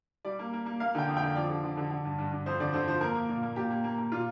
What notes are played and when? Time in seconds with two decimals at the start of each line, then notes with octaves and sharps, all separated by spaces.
0.25 G3 D5
0.39 A#3
0.53 A#3
0.66 A#3
0.80 A#3 F5
0.95 D3 G5
1.08 F2
1.17 G5
1.22 D3
1.36 F3 D5
1.50 D3
1.64 D3
1.77 D3
1.90 D3
2.05 G2
2.18 G2
2.32 G2
2.46 F2 C5
2.60 D3 D5
2.73 D3 C5
2.87 F3 C5
3.01 A#3 A#4
3.15 A#3
3.29 A#2
3.43 A#3
3.56 A#2 G4
3.70 A#3
3.84 A#3
3.98 A#3
4.12 A#2 F4